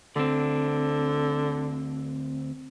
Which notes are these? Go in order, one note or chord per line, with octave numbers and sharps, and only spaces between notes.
D2 D3 C4